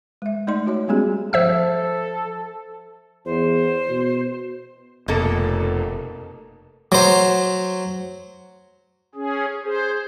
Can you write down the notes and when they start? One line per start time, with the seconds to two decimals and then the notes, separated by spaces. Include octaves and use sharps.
0.22 G#3 E5
0.47 A3 D#4 D5 D#5 C6
0.66 D#4 F#4 C#5 D#5
0.88 G3 G#3 B3 C#4 G4 G#4
1.33 F3 A4 C5 E5 E6
3.25 E2 C5
3.89 B2
5.08 F1 B2 A#3 A4
6.92 F#3 C5
9.15 C#4 G#4
9.64 G#4 C5